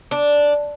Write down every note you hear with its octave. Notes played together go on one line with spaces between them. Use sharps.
D4